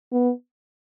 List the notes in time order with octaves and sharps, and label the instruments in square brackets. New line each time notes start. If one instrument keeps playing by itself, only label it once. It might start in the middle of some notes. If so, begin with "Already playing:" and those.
[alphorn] B3